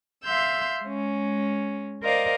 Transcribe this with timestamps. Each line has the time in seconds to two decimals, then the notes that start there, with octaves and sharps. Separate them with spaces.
0.24 E5 F5 C6 E6 G6
0.83 G#3 C#4
2.03 A#4 C5 D5 D#5 F5